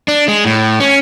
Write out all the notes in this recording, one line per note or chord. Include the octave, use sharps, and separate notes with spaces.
D4
G#3
A2
C#4